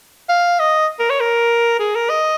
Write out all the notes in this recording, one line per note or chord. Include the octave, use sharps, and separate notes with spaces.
F5
D#5
A#4
C#5
A#4
G#4
A#4
D#5